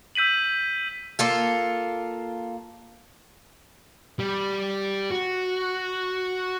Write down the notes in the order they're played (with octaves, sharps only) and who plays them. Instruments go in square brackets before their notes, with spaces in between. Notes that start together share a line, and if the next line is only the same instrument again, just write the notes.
[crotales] E6 G6 B6 D#7 F#7
[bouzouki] A#3 F4 A4
[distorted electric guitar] G3
F#4